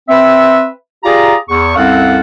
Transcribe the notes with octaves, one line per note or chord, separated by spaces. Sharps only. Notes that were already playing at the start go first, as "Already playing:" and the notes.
C4 B4 E5
F4 G4 G#4 D5 A#5
E2 C#6
C2 F#2 C4 A4 F5 F#5